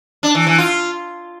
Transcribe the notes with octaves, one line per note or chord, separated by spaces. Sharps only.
D4
E3
E3
F4